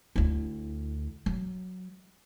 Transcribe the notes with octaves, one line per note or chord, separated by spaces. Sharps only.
D2 E4
F#3